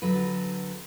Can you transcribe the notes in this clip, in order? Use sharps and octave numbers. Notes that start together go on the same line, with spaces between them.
D3 F#3 B4